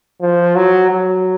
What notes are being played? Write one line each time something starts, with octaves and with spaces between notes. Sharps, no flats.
F3
F#3
F#3